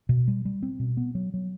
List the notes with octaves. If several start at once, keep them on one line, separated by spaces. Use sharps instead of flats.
B2
G3
G3
C4
B2
B3
F#3
F#3